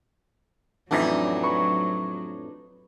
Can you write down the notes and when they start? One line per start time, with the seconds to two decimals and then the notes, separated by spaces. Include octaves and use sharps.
0.91 A1 F2 E3 F#3 D4 D#4
1.43 B4 B5 C#6